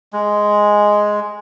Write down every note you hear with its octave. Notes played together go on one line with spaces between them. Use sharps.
G#3